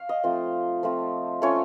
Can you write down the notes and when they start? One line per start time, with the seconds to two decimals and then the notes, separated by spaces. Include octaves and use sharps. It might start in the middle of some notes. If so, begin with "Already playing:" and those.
Already playing: F5
0.09 D#5
0.24 F3 A3 C4 F4
0.83 F3 A3 C4 F4
1.42 A3 C#4 F4 C#5